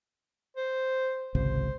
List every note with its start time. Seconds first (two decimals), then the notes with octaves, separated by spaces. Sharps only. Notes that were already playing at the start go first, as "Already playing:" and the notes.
0.56 C5
1.35 G#1 C#2 C3 C5